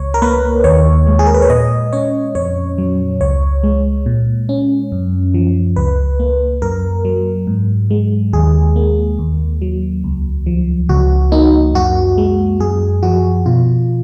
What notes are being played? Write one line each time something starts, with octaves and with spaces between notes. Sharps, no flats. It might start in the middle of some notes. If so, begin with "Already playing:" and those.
Already playing: C#2 C#5
A#4
A#3 B4
D#2 C#5
G#3
G#4
A#4
B4
C#5
A#2 D#5
C#4 C#5
F2 C#5
F#3
C#2 C#5
G#3
A#2
C#4
F#2
F3
C#2 B4
A#3
F#2 A#4
F#3
G#2
G#3
D#2 G#4
A#3
D#2
F#3
C#2
F3
C#2 F#4
A#3 D#4
F#2 F#4
G#3
F#2 G#4
F3 F#4
B2 F4